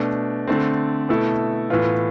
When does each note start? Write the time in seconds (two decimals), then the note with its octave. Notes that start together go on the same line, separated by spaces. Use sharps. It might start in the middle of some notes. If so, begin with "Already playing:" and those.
Already playing: B2 A3 D4
0.47 D3 A3 C4
1.09 B2 A3 E4 A4
1.70 A2 E3 B3 F4